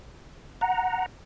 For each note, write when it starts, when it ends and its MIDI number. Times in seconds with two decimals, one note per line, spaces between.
0.61 1.06 78
0.61 1.06 82